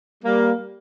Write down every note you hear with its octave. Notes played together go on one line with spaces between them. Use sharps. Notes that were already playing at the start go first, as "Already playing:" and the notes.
G3 A#3